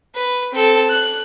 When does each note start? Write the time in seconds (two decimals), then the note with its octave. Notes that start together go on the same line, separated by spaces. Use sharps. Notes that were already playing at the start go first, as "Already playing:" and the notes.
0.15 B4
0.52 C4 A4
0.89 F#6